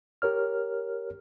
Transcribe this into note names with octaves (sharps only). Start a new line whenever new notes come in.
G4 A#4 C#5 F6